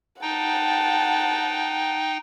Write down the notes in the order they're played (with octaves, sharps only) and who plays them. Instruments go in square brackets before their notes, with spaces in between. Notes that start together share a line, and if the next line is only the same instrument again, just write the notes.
[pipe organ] D#4 G5 [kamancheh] F#5 A5